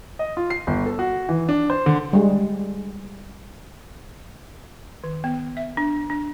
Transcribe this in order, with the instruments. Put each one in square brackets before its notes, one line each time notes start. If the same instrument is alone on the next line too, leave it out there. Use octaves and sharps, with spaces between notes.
[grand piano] D#5
F4
C7
G1
A4
F#4
E3
D4
C5
D3
[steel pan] G3 G#3
[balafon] D#3
B3
E5
D4
D4